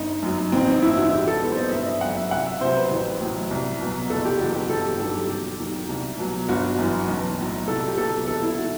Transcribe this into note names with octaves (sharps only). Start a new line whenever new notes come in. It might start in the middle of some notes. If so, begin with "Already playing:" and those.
Already playing: G1 D#4
F#2 F#3
A1 C4
D#4
G2 D#3 E4
F#4
E1 G4
A4
E2 D#3 F#3 B4
C5
D#5
G1 E5
D#5
F#2 F#3 F#5
E5
C2 F#5
E5
C3 F#3 C5
B4
A1
A2 F#3
C2
B2 F#3
F#1 A4
G4
E2 B2 F#3 F#4
G4
G1 A4
G4
G2 D#3 F#3 A4
G4
E1 G4
D#2 D#3 F#3
C2
B2 F#3
G1 F#4
F#2 E3
B1
A2 F#3
C2 A4
G4
B2 F#3 A4
E1 A4
E4
D#3 F#4